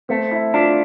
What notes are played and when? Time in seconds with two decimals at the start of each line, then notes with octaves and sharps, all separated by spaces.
0.09 A3 C4
0.31 E4
0.54 D4 F4